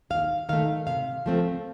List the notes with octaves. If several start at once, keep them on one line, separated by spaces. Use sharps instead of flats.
D#2 F5
D#3 A3 F5
C3 F5
F3 A3 C4